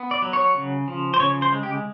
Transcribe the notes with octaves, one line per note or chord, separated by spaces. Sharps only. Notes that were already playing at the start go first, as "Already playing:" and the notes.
Already playing: B3
D5
F#3
C#5
C#3
F3
C5
C#3 C#5
C5
G#3
G4